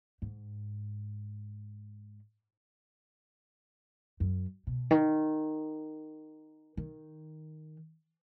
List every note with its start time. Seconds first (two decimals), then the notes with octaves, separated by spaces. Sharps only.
0.22 G#2
4.20 F#2
4.67 B2
4.91 D#3
6.77 D#3